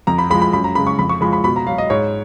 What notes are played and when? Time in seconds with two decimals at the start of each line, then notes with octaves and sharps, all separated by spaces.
0.07 F2 A#5
0.18 B5
0.30 G#3 B5
0.35 F3
0.42 B5
0.53 F#2 B5
0.64 A#5
0.75 C#3 B5
0.79 G#3
0.87 C#6
0.99 F2 B5
1.09 C#6
1.21 F3 G#3 B5
1.33 B5
1.44 B2 B5
1.56 A#5
1.67 F#3 F5
1.78 D#5
1.90 G#2 C#5